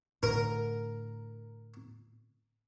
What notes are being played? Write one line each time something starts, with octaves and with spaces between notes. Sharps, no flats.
A2 D3 A#4